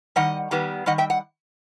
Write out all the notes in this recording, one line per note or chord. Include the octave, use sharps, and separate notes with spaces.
D#3 G3 D#5 F#5
D#3 G3 B3
D#3 G3 D#5 F#5
E5 G5
F#5